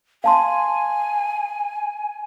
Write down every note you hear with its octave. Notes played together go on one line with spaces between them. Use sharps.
F5 G#5 A5 C6